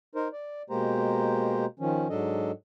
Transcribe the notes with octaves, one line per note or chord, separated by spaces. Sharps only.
D#4 A#4 C5
D5
B2 G#3 A#3 G4 C5 A#5
D#3 F3 C#4
G#2 F#3 D4 A4 D#5